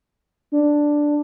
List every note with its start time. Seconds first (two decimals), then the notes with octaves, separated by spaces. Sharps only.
0.52 D4